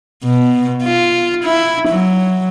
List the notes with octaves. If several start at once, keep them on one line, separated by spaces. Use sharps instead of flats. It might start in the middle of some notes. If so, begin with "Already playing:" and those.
B2
F4
E4
F#3